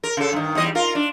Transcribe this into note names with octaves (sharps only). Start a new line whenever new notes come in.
A#4
C#3 A4
G2 D#3
E2 G3 D#5
F4 A#4
D4